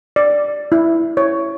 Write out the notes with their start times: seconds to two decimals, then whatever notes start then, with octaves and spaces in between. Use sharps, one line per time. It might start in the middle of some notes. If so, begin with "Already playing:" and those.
0.16 D5
0.72 E4
1.17 C#5